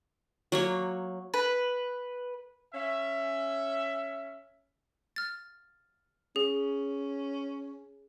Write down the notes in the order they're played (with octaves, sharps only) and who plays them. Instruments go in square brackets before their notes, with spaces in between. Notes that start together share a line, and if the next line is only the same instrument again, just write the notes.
[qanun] F#3 A#3 C#5
[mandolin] B4
[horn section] C#4 E5
[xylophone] F6 A6
[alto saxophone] C#4 [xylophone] G#4